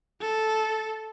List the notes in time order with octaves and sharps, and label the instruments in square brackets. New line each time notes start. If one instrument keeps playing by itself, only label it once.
[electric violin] A4